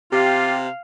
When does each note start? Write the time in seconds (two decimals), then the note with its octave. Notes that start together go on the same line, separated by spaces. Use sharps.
0.12 C3 F4 G4 F5